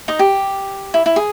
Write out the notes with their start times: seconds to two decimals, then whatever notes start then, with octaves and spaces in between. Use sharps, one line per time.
0.08 D#4 D#5
0.19 G4
0.94 E4
1.06 E4
1.16 G#4